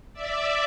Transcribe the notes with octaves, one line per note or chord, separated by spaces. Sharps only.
D5 E5